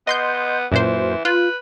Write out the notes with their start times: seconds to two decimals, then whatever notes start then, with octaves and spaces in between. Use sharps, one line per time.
0.07 B3 D#5 C6 G6
0.72 F#2 A#2 E3 C5
1.25 F4 B4